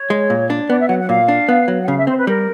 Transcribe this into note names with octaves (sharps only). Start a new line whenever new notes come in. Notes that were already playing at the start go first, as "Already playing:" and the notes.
Already playing: C#5
G#3
A#2
D4
B3 D5
E5
F#3 F#5
F#5
A#2 F5
D4
B3
F#3
F#5
C#3 F5
E5
C4 C5
B4
G3 A#4